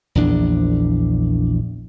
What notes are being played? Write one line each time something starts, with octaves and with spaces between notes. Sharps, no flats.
A#1 E2 D4